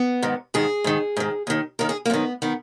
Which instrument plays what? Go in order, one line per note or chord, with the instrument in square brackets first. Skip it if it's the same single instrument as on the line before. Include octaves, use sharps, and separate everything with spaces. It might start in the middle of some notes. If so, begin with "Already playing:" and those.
Already playing: [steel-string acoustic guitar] B3
G#2 D#3
G#2 D#3 G#4
G#2 D#3
G#2 D#3
D#2 D#3
D#2 D#3 A#4
G#4
A#3
F#2 D#3 B3
D#3 B3